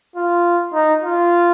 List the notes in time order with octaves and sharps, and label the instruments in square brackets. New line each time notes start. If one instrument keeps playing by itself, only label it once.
[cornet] F4
D#4
F4